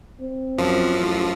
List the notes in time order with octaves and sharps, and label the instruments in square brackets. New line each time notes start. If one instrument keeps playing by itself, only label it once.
[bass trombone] C4
[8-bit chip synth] F#2 F3
[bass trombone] A1